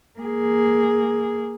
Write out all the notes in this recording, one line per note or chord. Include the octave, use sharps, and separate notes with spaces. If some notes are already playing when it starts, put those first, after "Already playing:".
A#3 G#4